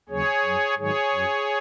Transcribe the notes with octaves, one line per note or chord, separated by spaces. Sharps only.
D#2 C#3 F#3 G#4 C#5
F#2 F#3
G#2 D#3 F#3 G#4 C#5
F#2 F#3